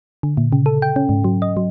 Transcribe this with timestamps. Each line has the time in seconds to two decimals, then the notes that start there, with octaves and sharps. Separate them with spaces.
0.23 D3
0.37 A#2
0.53 C#3
0.66 A4
0.82 G5
0.96 C#4
1.09 G#2
1.24 F#3
1.42 D#5
1.57 F#3